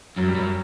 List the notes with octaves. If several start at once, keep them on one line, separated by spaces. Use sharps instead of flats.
F#2 F#3
G3
F#2 F#3